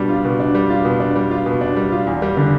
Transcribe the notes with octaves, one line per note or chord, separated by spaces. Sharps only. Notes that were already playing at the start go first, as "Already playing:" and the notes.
Already playing: B2 G3 D4
F4
B2
D4
G3
F4
B2
D4
G3
F4
B2
D4
G3
F4
E2
G3
D3